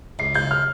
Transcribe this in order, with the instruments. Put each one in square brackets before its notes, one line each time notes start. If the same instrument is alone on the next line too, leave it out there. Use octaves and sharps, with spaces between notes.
[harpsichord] C#2 [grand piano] C7
[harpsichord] C#3 [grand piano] G6
[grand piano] F6